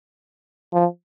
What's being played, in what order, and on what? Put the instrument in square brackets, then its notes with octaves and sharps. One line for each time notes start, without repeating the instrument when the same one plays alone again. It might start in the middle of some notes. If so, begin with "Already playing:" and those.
[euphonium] F3